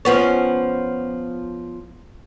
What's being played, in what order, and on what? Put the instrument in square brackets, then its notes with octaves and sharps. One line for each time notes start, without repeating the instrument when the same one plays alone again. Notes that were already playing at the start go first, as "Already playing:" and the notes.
[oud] F3 B3 C#4